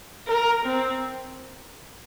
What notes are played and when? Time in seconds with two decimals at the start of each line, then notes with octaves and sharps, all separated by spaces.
0.28 A#4
0.66 C4